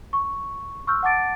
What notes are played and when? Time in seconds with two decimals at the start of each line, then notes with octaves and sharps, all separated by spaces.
0.13 C#6
0.87 C6 C#6 E6 F6 G6
1.03 F#5 A5 D6 A6 D7